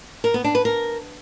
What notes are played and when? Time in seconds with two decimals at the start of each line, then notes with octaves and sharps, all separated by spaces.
0.24 A#4
0.34 B3
0.44 D4
0.55 B4
0.65 A#4